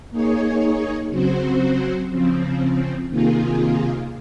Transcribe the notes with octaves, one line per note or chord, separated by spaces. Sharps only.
A#3 D#4 G#4 C#5
C#3 F#3 C4 F#4 C5
C#3 F3 C4
C3 D#3 A#3 F4 G#4